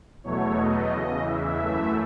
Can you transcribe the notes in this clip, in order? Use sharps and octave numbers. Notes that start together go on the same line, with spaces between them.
E2 B2 F#3 A3 C#5
D#5
E2 C#3 E3
E5
F#2 E3 A3